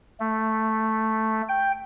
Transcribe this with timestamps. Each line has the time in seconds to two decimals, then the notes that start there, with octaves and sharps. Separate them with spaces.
0.20 A3
1.49 G5